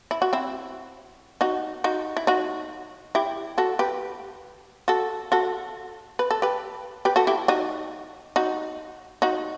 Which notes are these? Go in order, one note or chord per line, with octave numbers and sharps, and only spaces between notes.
E4
F#4
C4 E4
D#4 F#4
D#4 F#4
E4
D#4 F#4
E4 G4
F#4 A4
G4 B4
F#4 A4
F#4 A4
B4
A4
G4 B4
G4 B4
F#4 A4
E4 G4
D#4 F#4
D#4 F#4
D#4 F#4